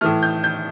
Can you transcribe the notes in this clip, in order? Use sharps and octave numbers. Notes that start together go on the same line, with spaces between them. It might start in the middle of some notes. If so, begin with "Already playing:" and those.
A2 E3 A3 F6
G6
G6